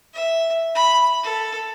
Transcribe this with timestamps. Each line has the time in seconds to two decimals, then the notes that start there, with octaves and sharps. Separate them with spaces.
0.14 E5
0.75 B5
1.23 A4